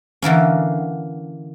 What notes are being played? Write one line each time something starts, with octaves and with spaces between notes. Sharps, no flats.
D3 E3 A#3 C#4